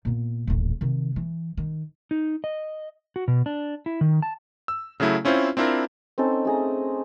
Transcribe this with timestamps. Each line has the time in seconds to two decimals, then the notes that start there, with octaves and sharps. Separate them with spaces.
0.05 A#2 B3
0.47 D#1 A1
0.81 C3 D#3
1.16 E3
1.57 D#3
2.11 D#4
2.44 D#5
3.16 F#4
3.28 B2
3.46 D4
3.86 E4
4.01 D#3
4.22 A5
4.68 E6
5.00 C#3 F#3 A3 E4
5.25 C4 C#4 E4 F4 C5
5.57 C4 D4 E4 F4 A#4
6.18 C4 C#4 D#4 A4
6.45 A3 G#4 A#5